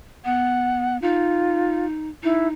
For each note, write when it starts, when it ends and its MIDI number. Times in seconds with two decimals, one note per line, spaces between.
0.25 1.00 59
0.25 0.97 78
1.02 2.09 63
1.02 1.86 65
2.23 2.53 63
2.23 2.47 64